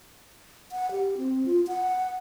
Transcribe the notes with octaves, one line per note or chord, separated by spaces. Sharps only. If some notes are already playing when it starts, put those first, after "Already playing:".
F#5
G4
C4
F4
F#5